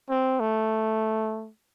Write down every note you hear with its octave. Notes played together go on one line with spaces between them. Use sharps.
C4
A3